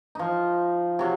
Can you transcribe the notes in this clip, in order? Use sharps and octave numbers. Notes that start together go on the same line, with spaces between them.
F3 D#4
C3 F#3